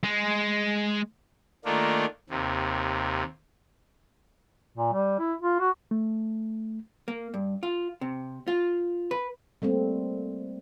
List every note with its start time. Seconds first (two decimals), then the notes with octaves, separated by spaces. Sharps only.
0.04 G#3
1.65 D#3 A3 A#3 D4 F4
2.30 D#2 C3
4.78 A#2
4.93 G3
5.19 E4
5.42 F4
5.60 F#4
5.91 A3
7.08 A#3
7.34 G2
7.63 F4
8.01 C3
8.48 F4
9.11 B4
9.62 G3 A3 A#3 C4